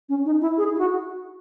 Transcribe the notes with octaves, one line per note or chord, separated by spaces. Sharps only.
C#4
D#4
E4
G#4
E4
F#4